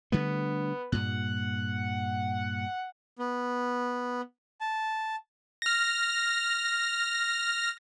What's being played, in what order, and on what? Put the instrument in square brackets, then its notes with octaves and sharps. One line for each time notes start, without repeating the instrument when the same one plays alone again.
[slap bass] D3 G3 A3 [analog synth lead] B3
[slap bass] G2 A#2 [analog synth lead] F#5
[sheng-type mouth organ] B3
A5
[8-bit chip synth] F6 A#6